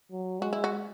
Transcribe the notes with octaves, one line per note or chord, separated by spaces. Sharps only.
F#3
G#3 F#4
E4
F#4